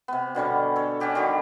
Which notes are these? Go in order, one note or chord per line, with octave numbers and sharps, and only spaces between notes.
C3 B3
B2 D3 G3 C#4
A4 C#5
C#4 F#4 G4 D5
D3 D#3 G3 G4